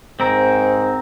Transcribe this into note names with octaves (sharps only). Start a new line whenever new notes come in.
G#2 C4 A#4